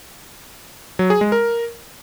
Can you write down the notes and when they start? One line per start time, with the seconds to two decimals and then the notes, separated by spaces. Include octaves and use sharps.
0.99 F#3
1.10 G#4
1.21 G#3
1.32 A#4